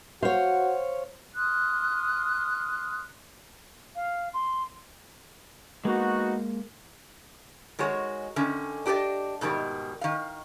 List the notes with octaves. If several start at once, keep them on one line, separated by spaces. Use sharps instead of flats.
F#4 C5 C#5 F5
C6 D#6 F6 F#6
F5
C6
G#3 A#3 B3 D#4 F#4
D#3 G#3 F#4 C#5
D3 D#3 C#4
D4 G4 A4 C5 D5 D#5
G#2 B2 D#3 G3
D#3 F5